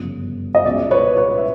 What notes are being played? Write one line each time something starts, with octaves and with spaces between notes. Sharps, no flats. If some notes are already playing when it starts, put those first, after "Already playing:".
Already playing: G1 F#2 C#3 F3
D#5
C#2 B2 F#3 D5 E5
B4 C#5
B4 C#5
E5